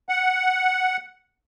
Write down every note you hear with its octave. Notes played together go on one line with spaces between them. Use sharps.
F#5